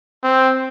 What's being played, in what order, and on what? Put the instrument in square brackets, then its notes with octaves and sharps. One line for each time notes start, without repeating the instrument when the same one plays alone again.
[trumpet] C4